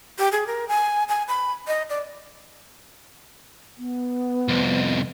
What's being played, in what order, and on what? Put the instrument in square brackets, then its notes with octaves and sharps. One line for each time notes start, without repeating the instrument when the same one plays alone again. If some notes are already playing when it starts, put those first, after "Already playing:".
[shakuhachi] G4
G#4
A#4
G#5
G#5
B5
D#5
D5
[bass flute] B3
[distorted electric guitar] C2 F2